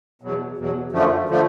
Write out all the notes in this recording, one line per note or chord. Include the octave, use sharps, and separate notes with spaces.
E2 B2 F#3
E2 B2 F#3
F#2 D3 F3 A3
D3 F3 A3